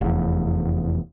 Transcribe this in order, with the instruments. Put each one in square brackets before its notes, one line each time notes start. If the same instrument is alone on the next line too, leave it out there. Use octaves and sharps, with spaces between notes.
[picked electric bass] F1 E2